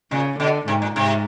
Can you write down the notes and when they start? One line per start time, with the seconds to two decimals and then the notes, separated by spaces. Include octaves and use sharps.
0.11 A#2 C#3
0.39 B2 D3
0.67 G#2 C3
0.82 A#2
0.96 G#2 C3